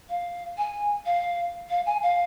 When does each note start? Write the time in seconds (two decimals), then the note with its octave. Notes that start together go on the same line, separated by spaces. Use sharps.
0.09 F5
0.58 G#5
1.05 F5
1.69 F5
1.86 G#5
2.02 F5